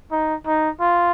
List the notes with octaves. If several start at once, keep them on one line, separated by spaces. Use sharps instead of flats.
D#4
D#4
F4